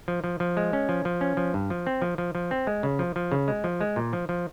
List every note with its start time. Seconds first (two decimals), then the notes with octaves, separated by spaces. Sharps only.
0.08 F3
0.24 F3
0.40 F3
0.57 G#3
0.73 C#4
0.89 F3
1.05 F3
1.21 C#4
1.37 F3
1.54 G2
1.70 F3
1.87 C4
2.02 F3
2.18 F3
2.35 F3
2.51 C4
2.67 G#3
2.83 C#3
2.99 F3
3.16 F3
3.32 C#3
3.48 G#3
3.64 F3
3.81 G#3
3.96 A#2
4.13 F3
4.29 F3